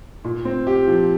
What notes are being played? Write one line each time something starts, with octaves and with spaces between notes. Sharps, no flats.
A#2
C4
G4
F3